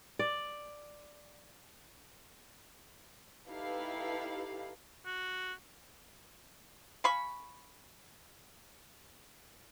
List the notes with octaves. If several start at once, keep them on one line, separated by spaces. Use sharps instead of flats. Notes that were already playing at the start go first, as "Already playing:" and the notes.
D5
D#4 E4 G4 A4 B4 F5
F#4
F5 G#5 B5 C#6